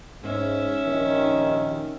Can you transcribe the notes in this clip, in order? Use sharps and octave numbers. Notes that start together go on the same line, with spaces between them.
G#2 C#4 E5
A#1 D#2 D#3